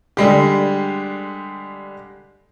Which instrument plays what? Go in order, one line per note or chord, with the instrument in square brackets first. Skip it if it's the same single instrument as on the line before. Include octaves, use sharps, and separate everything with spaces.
[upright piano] D3 G3 G#3 G4